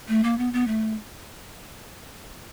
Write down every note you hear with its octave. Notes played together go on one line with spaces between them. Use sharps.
A3
A#3
B3
B3
A3